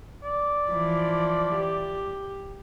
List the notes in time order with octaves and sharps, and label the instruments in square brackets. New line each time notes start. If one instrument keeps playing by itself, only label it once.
[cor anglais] D5
[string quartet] E3 F3
G4